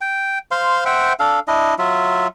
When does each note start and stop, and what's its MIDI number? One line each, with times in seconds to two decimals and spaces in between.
0.01 0.39 79
0.51 0.84 72
0.51 0.84 77
0.51 0.84 84
0.85 1.13 72
0.85 1.13 76
0.85 1.13 78
0.85 1.13 79
1.20 1.40 62
1.20 1.40 69
1.20 1.40 77
1.48 1.74 62
1.48 1.74 64
1.48 1.74 75
1.78 2.27 54
1.78 2.27 65
1.78 2.27 76